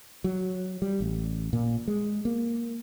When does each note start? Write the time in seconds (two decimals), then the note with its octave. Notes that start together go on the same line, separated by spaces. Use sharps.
0.24 F#3
0.82 G3
1.00 A1
1.53 A#2
1.88 G#3
2.25 A#3